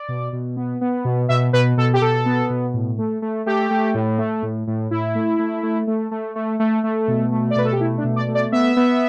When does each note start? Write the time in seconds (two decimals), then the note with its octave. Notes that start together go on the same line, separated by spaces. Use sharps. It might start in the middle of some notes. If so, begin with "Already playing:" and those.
Already playing: D5
0.08 B2
0.33 B2
0.57 B3
0.81 B3
1.05 B2
1.29 B2 E5
1.53 B2 B4
1.77 B2 A4
1.94 G4
2.01 B2 A4
2.26 B3
2.50 B2
2.74 A2
2.98 A3
3.22 A3
3.46 A3 G4
3.70 A3
3.94 A2
4.18 A3
4.43 A2
4.67 A2
4.91 A2 E4
5.15 A3
5.39 A3
5.63 A3
5.87 A3
6.11 A3
6.36 A3
6.60 A3
6.84 A3
7.08 B2
7.32 A3
7.51 D5
7.56 B2 B4
7.65 A4
7.73 G4
7.80 A3 E4
7.98 D4
8.04 B2
8.16 D5
8.28 A3
8.35 D5
8.52 B3 E5
8.77 B3